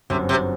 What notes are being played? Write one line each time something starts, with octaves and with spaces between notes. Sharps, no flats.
G1 F#2 C3 F#3 C4
C3